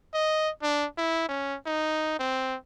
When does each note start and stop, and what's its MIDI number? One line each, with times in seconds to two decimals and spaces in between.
0.14 0.50 75
0.62 0.86 62
0.98 1.28 64
1.28 1.56 61
1.66 2.15 63
2.19 2.56 60